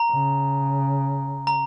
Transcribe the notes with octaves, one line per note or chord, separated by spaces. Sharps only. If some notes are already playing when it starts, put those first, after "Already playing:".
Already playing: A#5
C#3
A#5